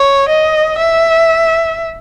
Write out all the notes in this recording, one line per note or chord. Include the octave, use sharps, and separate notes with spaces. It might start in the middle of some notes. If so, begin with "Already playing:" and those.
Already playing: C#5
D#5
E5